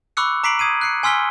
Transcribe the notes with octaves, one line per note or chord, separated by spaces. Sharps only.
B5 C#6 D6 E6 F#6 C#7
A#5 D6 B6 C7 D7 F#7
D#6 G#6 C7 D#7
F#6 C7 C#7
G#5 C6 E6 F6 B6 G7